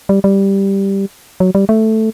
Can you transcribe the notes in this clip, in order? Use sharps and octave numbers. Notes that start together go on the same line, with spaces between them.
G3
G3
F#3
G3
A3